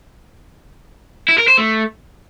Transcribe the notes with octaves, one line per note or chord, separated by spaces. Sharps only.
E4
A#4
C5
A3